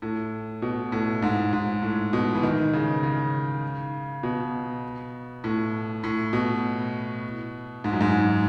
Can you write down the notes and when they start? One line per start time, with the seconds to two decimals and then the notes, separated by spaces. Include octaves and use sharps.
0.02 A2
0.62 B2
0.92 A2
1.22 G#2
1.53 G#2
1.82 A2
2.13 B2
2.35 E3
2.43 D#3
2.73 C#3
3.03 C#3
4.23 B2
5.44 A2
6.04 A2
6.33 B2
7.84 G#2
7.92 F#2
8.01 G#2